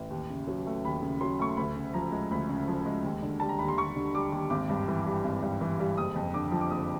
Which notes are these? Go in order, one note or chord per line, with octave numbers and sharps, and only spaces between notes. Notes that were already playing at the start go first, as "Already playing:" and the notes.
Already playing: A1
D#2
C#3
F#3
A3
D#2 B5
C#3
F#3 C6
A3 C#6
C6
D2 B5
C#3
F3 A#5
G#3
D2 B5
C#3
F3
G#3
D#2
D3
G3 A5
A#5
D#2 B5
C6
D#2 C#6
D3
G3 D6
D#2
G#1 D6
G2
E3
G3
G#1
G2
E3
G3
F#1 D#6
F2
D3 D6
F3
D6
F#1 D#6